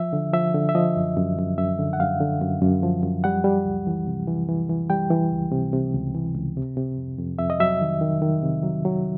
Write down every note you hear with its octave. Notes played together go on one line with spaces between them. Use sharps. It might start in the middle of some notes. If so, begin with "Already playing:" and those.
Already playing: F3 E5
D3
F3 E5
D3
E5
F3 D#5
F#2
F#2
F#2
F#2 E5
D3
F#5
F#2 F5
D3
F#2
F#2
F3
F#2
G3 F#5
G3
C#2
E3
C3
E3
E3
E3
G3 G5
E3
C#2
C3
C3
C#2
E3
C#2
C3
C3
F2
F2
F2 E5
D#5
F#3 E5
D#3
D#3
D#3
C3
F#3
F#3